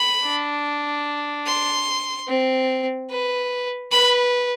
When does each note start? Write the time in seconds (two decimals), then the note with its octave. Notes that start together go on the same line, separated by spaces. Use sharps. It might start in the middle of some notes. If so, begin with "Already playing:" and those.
Already playing: B5
0.24 D4
1.47 C6
2.28 C4
3.10 B4
3.92 B4 B5